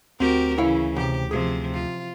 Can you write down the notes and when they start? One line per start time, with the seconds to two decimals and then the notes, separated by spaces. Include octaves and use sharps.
0.20 D2 C4 F#4 G4 A#4
0.58 C#3 E3 E4 C#5 F5
0.96 B1 C3 G4
1.31 C3 F3 G#4
1.74 F4